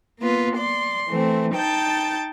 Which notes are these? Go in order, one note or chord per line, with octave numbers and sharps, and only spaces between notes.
A#3 B3 F4 B4
D5 C6
E3 A3 C4
D#4 G5 A5 G6 A6